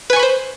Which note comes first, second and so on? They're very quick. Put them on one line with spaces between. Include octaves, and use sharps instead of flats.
B4 G#5 C#6 B5 C5